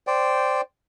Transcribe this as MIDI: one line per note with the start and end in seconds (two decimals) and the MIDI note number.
0.07 0.61 72
0.07 0.61 74
0.07 0.61 79